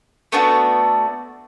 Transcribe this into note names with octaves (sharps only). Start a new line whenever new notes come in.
A3 B3 D4 F#4